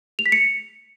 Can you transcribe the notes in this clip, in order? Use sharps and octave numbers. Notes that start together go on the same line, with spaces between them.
F7
B6
C#7